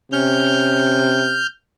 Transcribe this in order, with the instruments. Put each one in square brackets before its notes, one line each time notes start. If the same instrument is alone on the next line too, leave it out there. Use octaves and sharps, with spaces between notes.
[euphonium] C3 [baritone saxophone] C#4 [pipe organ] F6 G6